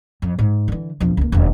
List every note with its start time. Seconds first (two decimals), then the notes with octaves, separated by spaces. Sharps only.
0.22 F2
0.39 G#2
0.68 D3 E3
1.00 E1 F3
1.17 C#2 A#3
1.32 E1 D#2